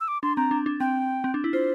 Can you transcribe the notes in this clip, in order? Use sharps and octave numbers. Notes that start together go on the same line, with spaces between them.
E6
D6
D4 C6
C4 A#5
D4
D4
C4 G5
C4
D4
E4
F4 C5